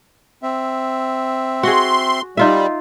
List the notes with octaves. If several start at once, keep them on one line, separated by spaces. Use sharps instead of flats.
C4 E5
F#4 G#4 C6
G3 D#4 F4 E5